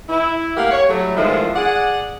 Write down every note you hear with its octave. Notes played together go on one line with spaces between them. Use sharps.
E4
A3 A#3 G4 A#4 F5 F#5
C#5
A2 F#3 G3 A3
E2 D#3 F3 G#3 A3 E4
G#4 D5 F#5